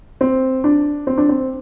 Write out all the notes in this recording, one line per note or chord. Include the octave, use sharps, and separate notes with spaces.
C4
D4
C4
D4
C4